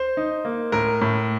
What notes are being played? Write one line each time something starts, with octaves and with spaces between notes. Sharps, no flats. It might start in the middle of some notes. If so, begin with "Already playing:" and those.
Already playing: C5
D#4
A#3
A2 A#4
A2